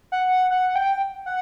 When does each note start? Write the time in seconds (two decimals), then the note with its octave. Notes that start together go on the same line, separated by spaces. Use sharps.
0.12 F#5
0.50 F#5
0.76 G5
1.26 F#5